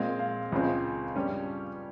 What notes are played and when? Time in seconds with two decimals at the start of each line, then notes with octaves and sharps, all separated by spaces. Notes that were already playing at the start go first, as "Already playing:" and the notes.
Already playing: A#2 G#3 C4 F5
0.19 F5
0.52 C#2 C#3 G#3 C4
1.15 G2 G3 C#4